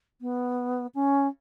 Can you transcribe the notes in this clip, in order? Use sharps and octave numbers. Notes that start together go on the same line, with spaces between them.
B3
C#4